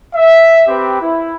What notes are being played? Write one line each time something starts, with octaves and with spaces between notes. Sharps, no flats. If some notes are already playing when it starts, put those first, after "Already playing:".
E5
C4 G4 B4
E4